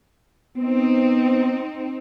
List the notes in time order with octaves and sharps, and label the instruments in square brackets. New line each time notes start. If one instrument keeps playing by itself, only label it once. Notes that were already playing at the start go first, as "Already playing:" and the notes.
[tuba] B3 [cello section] C4 D#4